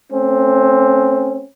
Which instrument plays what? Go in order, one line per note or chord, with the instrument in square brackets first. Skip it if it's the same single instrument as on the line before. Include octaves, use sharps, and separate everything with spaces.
[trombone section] A3 C4 C#4